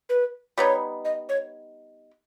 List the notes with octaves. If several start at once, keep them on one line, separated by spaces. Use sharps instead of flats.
B4
G3 B3 D#4 C#5
D#5
C#5